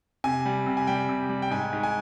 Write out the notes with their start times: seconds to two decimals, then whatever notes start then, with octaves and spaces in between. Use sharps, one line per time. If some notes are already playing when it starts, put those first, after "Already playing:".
0.24 C3 G#5
0.46 G3
0.66 C3
0.77 G#5
0.87 G3 G5
1.09 C3
1.29 G3
1.42 G5
1.51 G#2 G#5
1.73 G#2
1.83 G#5